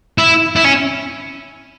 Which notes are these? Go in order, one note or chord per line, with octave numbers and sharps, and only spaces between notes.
E4
E4
C#4